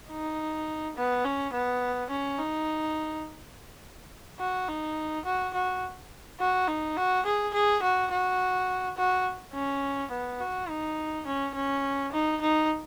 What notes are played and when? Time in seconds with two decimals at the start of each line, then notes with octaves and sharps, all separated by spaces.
0.10 D#4
0.97 B3
1.25 C#4
1.54 B3
2.10 C#4
2.39 D#4
4.39 F#4
4.68 D#4
5.25 F#4
5.54 F#4
6.40 F#4
6.68 D#4
6.97 F#4
7.26 G#4
7.54 G#4
7.83 F#4
8.11 F#4
8.97 F#4
9.54 C#4
10.11 B3
10.40 F#4
10.69 D#4
11.26 C#4
11.55 C#4
12.12 D#4
12.41 D#4